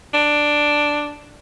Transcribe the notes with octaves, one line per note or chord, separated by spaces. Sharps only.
D4